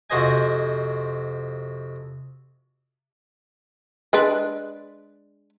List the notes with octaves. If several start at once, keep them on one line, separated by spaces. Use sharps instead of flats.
F2 C3 F#4 C5 D#5 G#5
G#3 D4 B4